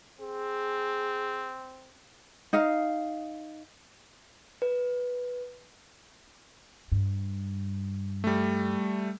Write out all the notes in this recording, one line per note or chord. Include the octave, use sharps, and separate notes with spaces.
C4 G#4
D#4 D#5 F5
B4
G2
G3 A3